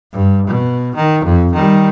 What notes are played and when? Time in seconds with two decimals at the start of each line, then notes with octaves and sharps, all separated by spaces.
0.13 G2
0.47 B2
0.96 D#3
1.25 F2
1.54 D#3 G3